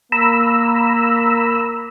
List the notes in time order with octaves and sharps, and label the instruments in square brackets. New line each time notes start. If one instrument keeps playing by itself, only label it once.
[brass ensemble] A#3 [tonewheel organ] A#5 B5 E6